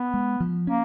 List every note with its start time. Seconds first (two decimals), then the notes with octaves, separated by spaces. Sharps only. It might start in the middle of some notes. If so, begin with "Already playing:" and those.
Already playing: B3
0.14 G#3
0.40 F3
0.67 A#3 C#4